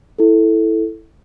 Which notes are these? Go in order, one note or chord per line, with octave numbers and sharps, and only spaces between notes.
E4 A4